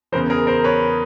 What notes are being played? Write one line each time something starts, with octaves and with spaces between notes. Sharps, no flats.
E2 C#3 E3 A#4 C5
G#4 A#4
A#4 C5
B4 C#5